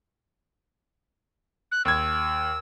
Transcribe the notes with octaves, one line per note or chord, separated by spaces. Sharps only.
F#6
D#2 E6 G#6